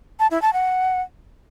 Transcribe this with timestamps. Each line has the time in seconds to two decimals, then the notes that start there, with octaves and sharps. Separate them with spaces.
0.20 A5
0.31 E4
0.42 A5
0.53 F#5